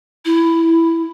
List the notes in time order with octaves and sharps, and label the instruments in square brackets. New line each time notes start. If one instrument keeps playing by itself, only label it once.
[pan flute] E4